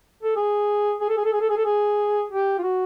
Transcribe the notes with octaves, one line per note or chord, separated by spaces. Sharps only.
A4
G#4
G#4
A4
G#4
A4
G#4
A4
G#4
A4
G#4
G4
F4
F#4